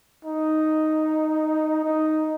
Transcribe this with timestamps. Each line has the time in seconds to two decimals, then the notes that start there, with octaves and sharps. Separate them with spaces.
0.25 D#4
1.85 D#4